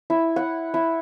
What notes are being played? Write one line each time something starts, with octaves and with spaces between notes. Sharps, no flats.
E4
F#5
E4